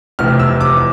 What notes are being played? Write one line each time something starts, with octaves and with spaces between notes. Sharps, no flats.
F1 E2 C3 F6
E6
D6